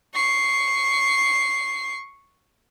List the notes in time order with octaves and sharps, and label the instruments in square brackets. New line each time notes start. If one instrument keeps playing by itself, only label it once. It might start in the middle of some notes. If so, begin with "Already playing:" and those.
[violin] C#6 C7